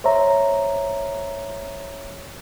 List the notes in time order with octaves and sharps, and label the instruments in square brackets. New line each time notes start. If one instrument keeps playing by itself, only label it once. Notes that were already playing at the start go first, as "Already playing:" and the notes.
[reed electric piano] C5 C#5 E5 A#5